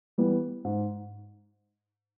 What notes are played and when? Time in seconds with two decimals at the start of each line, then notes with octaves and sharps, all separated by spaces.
0.18 E3 G3 B3
0.65 G#2